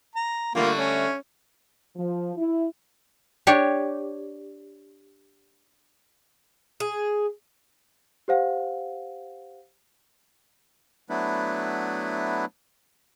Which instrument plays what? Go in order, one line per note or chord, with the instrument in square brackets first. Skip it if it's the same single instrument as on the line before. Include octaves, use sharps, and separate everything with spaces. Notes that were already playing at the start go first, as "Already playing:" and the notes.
[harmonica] A#5
[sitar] D3 G3 A3 [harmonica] A#3 F4
[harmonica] C#4
[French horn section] F3
E4
[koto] D4 G4 C#5
[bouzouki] G#4
[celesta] G4 C5 F5 F#5
[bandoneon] F#3 A3 B3 D4 E4 B4